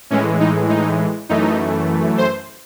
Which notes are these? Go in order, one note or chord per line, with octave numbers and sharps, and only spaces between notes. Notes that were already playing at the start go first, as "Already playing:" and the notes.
A2 E3 G#3 C#4
D#4
D#4
F#2 E3 A3 D#4
C5